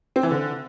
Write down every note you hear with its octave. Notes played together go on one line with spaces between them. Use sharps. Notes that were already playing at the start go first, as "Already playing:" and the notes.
C4
E3
D3